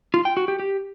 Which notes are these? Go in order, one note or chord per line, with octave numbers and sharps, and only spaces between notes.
F4
G5
F#4
G4
G4